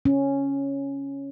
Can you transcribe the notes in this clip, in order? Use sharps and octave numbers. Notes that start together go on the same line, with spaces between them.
C#4